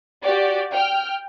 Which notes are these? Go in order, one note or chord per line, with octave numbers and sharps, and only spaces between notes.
F#4 G4 D5
G5 F6